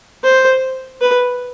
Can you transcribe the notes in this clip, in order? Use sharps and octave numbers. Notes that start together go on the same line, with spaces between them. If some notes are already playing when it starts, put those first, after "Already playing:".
C5
B4